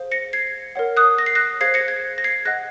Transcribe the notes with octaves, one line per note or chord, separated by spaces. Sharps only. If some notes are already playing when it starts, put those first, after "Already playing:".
Already playing: G#4 C5 F5
A#6 C#7
G#6 C7
A#4 C#5 F#5
D#6 F#6
A#6
C7
F#6 A#6
G#4 C5 F5 G#6 C7
A#6 C#7
G#6 C7
A#6
G#6 C7
G#4 D#5 F#5 F#6 A#6